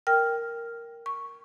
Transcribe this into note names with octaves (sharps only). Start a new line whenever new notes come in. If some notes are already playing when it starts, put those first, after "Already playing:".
A#4 G5 F6
C#6